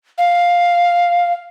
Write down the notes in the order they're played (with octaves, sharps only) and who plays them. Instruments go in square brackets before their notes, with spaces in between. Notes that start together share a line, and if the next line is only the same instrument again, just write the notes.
[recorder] F5